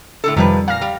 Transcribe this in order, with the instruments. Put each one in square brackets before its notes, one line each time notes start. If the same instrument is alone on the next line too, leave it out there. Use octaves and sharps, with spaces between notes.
[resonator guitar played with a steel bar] A2 D3 A4
[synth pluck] F2 D#3 G3 [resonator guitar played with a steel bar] C3 F3 B4
[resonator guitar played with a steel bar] A#2 [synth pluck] F5 F6 A#6
[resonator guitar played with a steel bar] G3